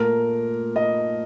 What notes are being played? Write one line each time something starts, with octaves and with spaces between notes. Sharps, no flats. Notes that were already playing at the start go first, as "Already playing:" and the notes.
Already playing: A#2 A3 A#4
D#5